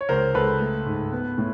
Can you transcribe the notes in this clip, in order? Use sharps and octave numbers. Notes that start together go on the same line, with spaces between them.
C#5
C#2 A#4 C5
C#2 A4 B4
A3
G#2
B3
A2